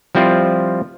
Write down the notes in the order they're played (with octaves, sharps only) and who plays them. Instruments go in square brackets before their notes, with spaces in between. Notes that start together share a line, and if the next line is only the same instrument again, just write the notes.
[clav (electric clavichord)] F3 G3 C4 E4 F4